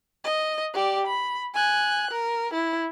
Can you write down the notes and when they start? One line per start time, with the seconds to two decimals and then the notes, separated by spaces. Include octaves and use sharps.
0.24 D#5
0.74 G4 D5
1.07 B5
1.55 G#5 F#6
2.11 A#4
2.54 E4